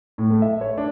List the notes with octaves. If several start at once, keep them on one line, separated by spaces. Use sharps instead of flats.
A2
A3
E5
C#5
D4